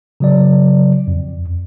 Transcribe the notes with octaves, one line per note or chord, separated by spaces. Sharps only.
C#3 F#3 D5
F2